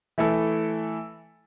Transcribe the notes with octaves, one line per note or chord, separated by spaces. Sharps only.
E3 A3 E4 A4